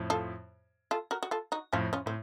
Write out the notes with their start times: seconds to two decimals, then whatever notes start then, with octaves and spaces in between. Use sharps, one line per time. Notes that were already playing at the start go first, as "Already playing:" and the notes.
Already playing: F2 A2
0.10 F4 A4
0.91 F4 A4
1.11 F#4 A#4
1.23 F#4
1.31 F4 A4
1.52 D#4 F#4
1.73 F2 A2 C#4 F4
1.93 C#4 F4
2.06 A2 C4